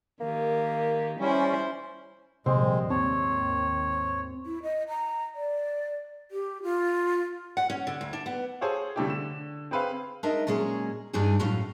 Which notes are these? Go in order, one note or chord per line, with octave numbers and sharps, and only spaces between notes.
D#3 A#3 G4
G3 C#4 E4 C5
A#1 C3 D#3 G3 G#3 C4 C5 G5
D#2 G#2 C4 C#5 A5
E4
D#5
A#5
D5
G4
F4
F#5
C#4
D3
D2
D4
B3
G#4 A4 C5 C#5 F5
D3 G3 A3 D4 E4 G4
D3 E7
C4 G#4 B4 C5 F5
G#3 D4 D#4 A#4 D#5 E5
A#2 F#3 G#3 C#4 G#4
G2 E3 G3 D4 D#4 G#4
F#2 A2 C#4 F5